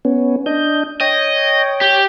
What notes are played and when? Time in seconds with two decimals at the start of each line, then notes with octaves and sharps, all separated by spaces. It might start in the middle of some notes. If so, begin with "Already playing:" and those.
0.05 B3 C#4
0.46 D4 D#5 G6
1.01 C#5 D#5 G5
1.81 G4